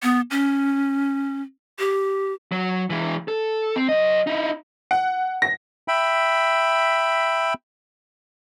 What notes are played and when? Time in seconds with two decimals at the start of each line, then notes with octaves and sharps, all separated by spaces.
0.03 B3
0.31 C#4
1.79 G4
2.52 F#3
2.90 E3 G#3
3.28 A4
3.76 C4
3.89 F#3 D#5
4.27 D#4 E4
4.91 F#5
5.42 A#6
5.88 E5 G5 B5